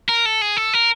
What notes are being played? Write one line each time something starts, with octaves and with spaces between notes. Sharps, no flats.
A#4
A4
G#4
A4
A#4